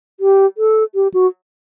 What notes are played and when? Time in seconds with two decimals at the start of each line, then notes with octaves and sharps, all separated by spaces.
0.20 G4
0.58 A4
0.95 G4
1.14 F#4